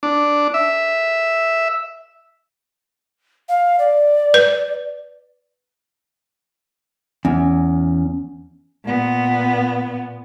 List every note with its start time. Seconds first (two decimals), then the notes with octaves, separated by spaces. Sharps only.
0.03 D4
0.54 E5
3.49 F5
3.79 D5
4.34 B4
7.25 E2 C#4
8.85 A#2 B3